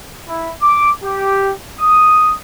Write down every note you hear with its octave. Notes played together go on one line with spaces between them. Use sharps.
E4
D6
G4
D#6